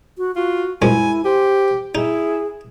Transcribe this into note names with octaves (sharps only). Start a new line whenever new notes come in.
F#4
F4 F#4
F#2 F3 G#3 E4 G#5
G4 C5
D#4 E4 G#4